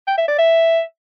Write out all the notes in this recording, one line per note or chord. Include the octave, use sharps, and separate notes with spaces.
G5
E5
D5
E5